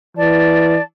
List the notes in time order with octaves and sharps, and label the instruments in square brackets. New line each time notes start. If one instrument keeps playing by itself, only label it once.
[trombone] E3 [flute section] D5 A5